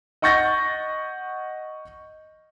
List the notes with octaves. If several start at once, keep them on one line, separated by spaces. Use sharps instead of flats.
D#5 F#5 C#6 G6 A6 A#6